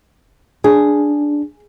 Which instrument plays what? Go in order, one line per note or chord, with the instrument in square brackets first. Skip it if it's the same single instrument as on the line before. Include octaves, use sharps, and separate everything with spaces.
[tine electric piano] D4 [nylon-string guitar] G#4